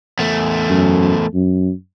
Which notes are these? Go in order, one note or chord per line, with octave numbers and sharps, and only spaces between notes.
E2 A3
F#2
F#2